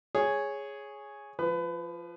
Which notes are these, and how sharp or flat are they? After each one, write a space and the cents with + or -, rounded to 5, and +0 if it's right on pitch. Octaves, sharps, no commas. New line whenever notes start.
G#4 +0 C#5 +0
F3 -10 B4 +25